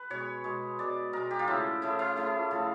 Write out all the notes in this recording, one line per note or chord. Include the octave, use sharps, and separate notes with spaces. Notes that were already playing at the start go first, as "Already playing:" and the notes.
Already playing: B4
B2 G#3 C#5
B2 G#3
B2 G#3 D5
B2 G#3 A#4
G4
F4
C#3 F3 A3 E4
C#3 F3 A3 E4
E4
C#3 F3 A3 E4
C#3 F3 A3 F4